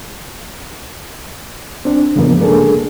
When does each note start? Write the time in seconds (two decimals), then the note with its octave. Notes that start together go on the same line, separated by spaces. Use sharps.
1.85 C4 D4
2.15 E2 G2 C#3 F3 A#3 B3
2.40 G#3 A#3 D4 G#4 A4